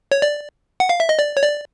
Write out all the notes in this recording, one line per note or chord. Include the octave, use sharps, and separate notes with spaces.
C#5
D5
F#5
F5
E5
D#5
D5
C#5
D5